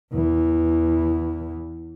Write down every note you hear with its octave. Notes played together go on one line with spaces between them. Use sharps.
E2 E3